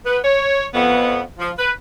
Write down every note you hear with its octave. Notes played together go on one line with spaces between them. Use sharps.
B3 B4
C#5
F2 B3
F3
B4